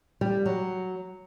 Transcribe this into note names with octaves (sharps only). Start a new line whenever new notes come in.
G3
F#3